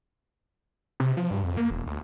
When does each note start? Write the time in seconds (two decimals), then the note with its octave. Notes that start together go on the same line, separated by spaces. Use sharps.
1.00 C3
1.17 F3
1.31 G2
1.44 F2
1.57 A#3
1.70 E1
1.87 D2